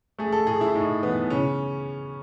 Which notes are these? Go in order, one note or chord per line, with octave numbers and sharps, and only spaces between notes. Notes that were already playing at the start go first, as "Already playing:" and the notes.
A3 G#4
A4
A2 G#4
E4
A2 D#4
E3 B3
C#3 C#4